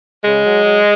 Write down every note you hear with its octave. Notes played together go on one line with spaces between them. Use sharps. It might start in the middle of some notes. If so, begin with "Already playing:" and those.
C#3 G#3
F#3
F#3